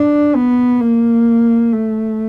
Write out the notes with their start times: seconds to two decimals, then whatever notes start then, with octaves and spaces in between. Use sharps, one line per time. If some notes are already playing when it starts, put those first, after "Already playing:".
Already playing: D4
0.35 B3
0.80 A#3
1.72 A3